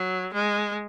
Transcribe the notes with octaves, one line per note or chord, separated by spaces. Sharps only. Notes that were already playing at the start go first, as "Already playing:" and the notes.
Already playing: F#3
G#3